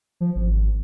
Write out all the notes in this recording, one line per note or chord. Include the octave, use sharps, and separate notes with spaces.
F3
G#1